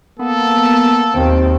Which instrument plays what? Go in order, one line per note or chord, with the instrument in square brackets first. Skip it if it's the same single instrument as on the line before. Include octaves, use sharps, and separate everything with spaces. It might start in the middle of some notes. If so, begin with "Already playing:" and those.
[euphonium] A#3 [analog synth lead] B3 [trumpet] A4
[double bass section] D#2 [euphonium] C4 [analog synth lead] G5